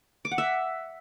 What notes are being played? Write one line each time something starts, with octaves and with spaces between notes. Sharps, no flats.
D6
F#5
E5